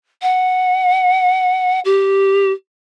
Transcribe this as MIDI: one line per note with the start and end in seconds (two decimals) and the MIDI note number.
0.22 1.80 78
1.85 2.52 67